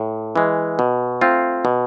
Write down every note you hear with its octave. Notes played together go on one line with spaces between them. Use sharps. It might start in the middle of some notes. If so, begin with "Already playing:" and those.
Already playing: A2
E3 G#3
B2
A3 C4 F4
B2